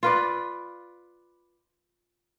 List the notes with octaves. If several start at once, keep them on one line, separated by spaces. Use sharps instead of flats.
F4 B4 D5